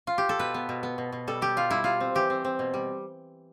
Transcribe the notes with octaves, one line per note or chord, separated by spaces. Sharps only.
F4
G4
A4
B2 B4
B3
B2
B3
B2
B2
G3 A4
G3 G4
G3 F4
G3 E4
G3 F4
C4
E3 G4
C4
C4
B2
G3